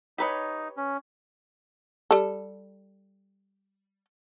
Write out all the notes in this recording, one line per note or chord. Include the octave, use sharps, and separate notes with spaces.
D#4 G4 B4 C#5
C#4
G3 A4